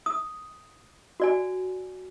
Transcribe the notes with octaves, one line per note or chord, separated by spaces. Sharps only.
D#6
F#4 D5 G#5